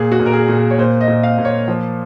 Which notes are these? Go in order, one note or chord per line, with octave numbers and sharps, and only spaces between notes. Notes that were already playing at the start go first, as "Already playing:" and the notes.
Already playing: A#2 G#4
F#4
A#2
A#4
G#4
A#2
G#4
C#5
A#2 C5
D#5
A#2
F5
A#2
C#5
F3